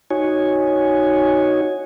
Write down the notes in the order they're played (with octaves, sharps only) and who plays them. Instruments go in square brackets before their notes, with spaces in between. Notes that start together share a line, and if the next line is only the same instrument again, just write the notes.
[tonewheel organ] D#4 F#4 C#5 G#5